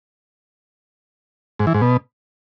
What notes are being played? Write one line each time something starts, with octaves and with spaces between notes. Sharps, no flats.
G#2
E3
G#2
B2